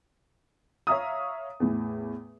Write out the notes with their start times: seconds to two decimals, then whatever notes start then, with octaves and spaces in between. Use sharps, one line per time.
0.87 C#5 E5 F5 A#5 D#6
1.60 E2 A2